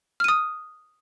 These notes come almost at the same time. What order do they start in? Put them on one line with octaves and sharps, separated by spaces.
F6 D#7 D#6